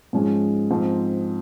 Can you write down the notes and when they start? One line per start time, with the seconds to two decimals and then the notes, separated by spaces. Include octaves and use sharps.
0.13 G#2 F3 G#3 C#4
0.70 G#2 F3 C4